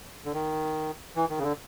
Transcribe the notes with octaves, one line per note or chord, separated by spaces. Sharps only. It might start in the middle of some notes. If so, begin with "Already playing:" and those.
D3
D#3
E3
D#3
C#3
D3